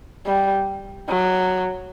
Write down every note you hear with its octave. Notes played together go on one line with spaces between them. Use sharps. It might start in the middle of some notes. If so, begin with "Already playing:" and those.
G3
F#3